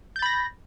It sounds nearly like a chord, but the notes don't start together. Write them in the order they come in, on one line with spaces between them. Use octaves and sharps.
G6 A6 B5 A#6